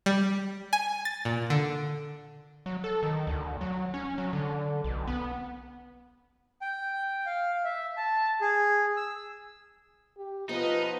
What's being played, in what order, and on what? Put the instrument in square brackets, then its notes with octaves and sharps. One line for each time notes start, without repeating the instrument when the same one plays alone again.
[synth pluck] G3
G#5
A6
A#2
D3
[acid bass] F#3
A4
D#3
D2
F#3
C#4
F#3
D3
B1
B3
[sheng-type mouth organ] G5
F5
E5
A5
G#4
E6
[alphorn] G4
[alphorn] F3 [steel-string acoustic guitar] B3 F4 [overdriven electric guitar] D#4 [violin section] B4 D#5